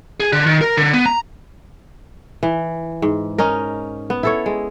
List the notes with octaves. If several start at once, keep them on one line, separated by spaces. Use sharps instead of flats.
G#4
D3
D#3
A#4
D3
B3
A#5
E3
G#2
C#4 D#4 A#4
B3
E4 A4 C#5
G#3